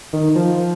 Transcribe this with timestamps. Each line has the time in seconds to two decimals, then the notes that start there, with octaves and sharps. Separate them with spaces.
0.13 D#3
0.35 F3